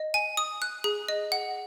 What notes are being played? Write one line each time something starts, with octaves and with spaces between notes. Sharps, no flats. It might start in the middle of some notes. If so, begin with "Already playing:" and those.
Already playing: D#5
G#5
D#6
F#6
G#4
D#5
F#5